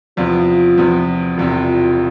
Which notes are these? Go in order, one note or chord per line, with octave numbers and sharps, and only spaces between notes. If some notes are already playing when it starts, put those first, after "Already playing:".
E2 C3 F3 B3 F4
E2 C3 F3 B3
E1 E2 C3 F4